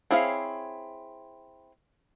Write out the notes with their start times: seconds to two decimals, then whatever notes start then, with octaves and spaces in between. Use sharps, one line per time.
0.11 C4 E4 G#4 C#5 F5